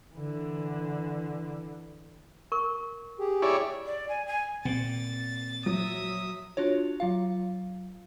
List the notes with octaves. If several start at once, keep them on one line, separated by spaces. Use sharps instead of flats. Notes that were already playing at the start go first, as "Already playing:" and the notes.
D3 E3
A#4 C#6
G4 G#4
E4 C#5 D5
D5
G#5
G#5
A#2 C4 A6
F3 F#3 E5 D#6
D4 F4 F#4 C#5
F#3 F4 F5